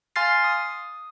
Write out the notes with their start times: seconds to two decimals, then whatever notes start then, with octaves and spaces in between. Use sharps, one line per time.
0.16 F5 G#5 C6 F6 A6 C7
0.44 D#6